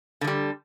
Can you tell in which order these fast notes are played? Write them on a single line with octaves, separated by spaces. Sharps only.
D3 G#3 G3